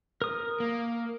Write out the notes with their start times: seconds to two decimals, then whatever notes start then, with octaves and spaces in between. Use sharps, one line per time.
0.22 A#4 D#6
0.60 A#3